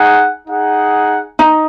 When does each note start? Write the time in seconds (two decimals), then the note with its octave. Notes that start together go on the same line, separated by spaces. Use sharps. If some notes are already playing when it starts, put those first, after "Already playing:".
Already playing: D#4 G#4 F#5
0.47 D#4 G#4 F#5
1.39 D#4